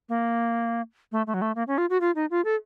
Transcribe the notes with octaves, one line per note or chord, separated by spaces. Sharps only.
A#3
A3
A3
F#3
A3
A#3
C#4
F4
F#4
F4
D#4
F4
A4